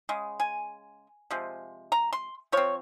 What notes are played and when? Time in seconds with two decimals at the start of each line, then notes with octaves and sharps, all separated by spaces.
0.09 C#3 G#3
0.40 G#5
1.30 C3 F3 G#3
1.92 A#5
2.13 C6
2.52 F3 C4 C#5